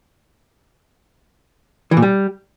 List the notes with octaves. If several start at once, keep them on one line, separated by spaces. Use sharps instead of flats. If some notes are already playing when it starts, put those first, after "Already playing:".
E3
A#2
G3